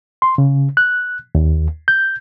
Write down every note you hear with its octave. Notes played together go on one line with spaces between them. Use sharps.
C6
C#3
F#6
D#2
G6